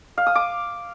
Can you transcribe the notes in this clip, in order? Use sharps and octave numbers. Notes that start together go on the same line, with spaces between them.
F5
D#6
D6